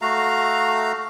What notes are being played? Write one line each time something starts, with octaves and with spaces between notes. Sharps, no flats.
A3 F#4 F5 A#5